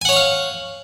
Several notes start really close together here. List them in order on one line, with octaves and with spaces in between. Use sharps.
G#5 F#5 C#5 C#6 F5